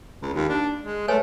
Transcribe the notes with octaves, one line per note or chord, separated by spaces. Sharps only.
C#2
D#2
D4
G#3
A3 B4 C#5 G#5